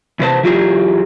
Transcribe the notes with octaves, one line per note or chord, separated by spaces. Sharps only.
E2 C3 B4 C5 A5
E3 F#3 F4 G4 G#4